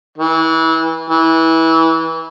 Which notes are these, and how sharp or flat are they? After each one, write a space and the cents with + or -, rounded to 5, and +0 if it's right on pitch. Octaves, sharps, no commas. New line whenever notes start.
E3 -25
E3 -20